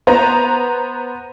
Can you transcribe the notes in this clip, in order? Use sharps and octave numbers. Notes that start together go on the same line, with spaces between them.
B3 C5 A#5